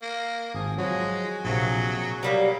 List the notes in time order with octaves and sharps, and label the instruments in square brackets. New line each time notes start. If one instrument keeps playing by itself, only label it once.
[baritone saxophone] A#3
[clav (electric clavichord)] G#1 A5 [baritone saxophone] F3 [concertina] G#4
[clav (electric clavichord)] F3 F#3 [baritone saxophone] G#3 [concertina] F#4 G#4
[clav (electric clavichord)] A#1 C3 A#3 [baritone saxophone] F#3
[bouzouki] F#3 G3 A#3 [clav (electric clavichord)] A#4